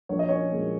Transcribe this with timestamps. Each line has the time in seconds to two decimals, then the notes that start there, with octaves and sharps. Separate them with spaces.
0.09 A#1 C#5
0.19 D#5
0.29 C#4 C#5
0.52 A#2 G#3